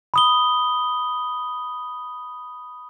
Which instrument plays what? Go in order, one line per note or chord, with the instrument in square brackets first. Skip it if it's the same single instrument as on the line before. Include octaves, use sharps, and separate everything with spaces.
[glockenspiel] B5 D#6 G7